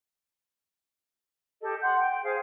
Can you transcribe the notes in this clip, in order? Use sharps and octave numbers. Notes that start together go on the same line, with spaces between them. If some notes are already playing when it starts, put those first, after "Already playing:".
G4 A4 D#5
F#5 C6 G6
G5
G#4 C5 F5